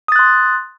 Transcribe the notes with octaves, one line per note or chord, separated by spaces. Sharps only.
C6 D#6 F#6 A6